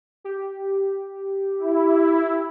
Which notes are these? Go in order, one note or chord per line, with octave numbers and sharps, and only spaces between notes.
G4
E4